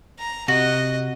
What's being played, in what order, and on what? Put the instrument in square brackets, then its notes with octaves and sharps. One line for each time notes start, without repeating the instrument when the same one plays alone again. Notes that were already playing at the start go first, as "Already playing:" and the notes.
[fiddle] A#5
[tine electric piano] C3 [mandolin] F#4 [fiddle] D#5